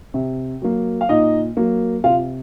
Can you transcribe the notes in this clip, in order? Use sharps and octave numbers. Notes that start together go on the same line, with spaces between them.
C3
F#3 A#3
F5
A#2 D#4 D#5
F#3 A#3
C3 F4 F5